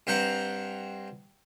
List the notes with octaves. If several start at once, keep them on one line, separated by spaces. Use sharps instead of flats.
G2 C4 C5 F#5 A#5